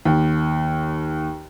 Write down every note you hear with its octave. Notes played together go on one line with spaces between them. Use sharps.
D#2